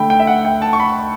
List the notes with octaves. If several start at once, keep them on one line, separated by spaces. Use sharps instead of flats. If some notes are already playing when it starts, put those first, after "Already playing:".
Already playing: D3 A3 G5 B5
G5
E5
F#5
G5
A5
C#6
B5